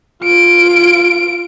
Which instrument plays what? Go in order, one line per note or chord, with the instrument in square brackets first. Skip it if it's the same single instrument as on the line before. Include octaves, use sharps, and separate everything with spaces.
[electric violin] F4 D7